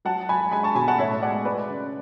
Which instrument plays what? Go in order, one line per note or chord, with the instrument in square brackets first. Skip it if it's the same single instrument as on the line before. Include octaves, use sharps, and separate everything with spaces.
[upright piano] F#3 F#5 A5
F#3 G#5 B5
G#3 G#5 B5
A5 C#6
B2 G#5 B5
F#5 A5
A2 C#5 E5
G#3 D5 F#5
G#3 B4 D5
C#3